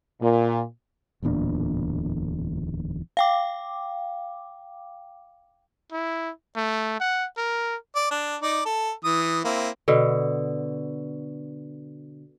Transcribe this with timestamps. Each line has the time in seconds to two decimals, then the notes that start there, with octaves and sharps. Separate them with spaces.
0.22 A#2
1.23 D1 E2 A#2 D4
3.17 F5 G5 D6
5.92 E4
6.56 A3
7.00 F#5
7.37 A#4
7.95 D5
8.11 D4
8.42 D#4 D5
8.65 A4
9.04 E3 D#6
9.44 A#3 C4 E4
9.88 B2 D3